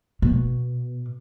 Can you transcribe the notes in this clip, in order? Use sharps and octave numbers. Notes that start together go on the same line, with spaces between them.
B2